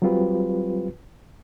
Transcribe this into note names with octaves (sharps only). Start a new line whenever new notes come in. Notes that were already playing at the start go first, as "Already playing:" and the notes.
F#3 G3 C4 F4 G4 B4